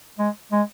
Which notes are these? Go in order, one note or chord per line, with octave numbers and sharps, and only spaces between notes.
G#3
G#3